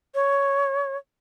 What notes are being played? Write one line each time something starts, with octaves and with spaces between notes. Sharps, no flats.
C#5